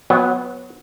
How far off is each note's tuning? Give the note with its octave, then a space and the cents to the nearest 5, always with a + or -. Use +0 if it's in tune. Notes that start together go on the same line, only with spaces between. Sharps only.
F#3 -25 B3 +0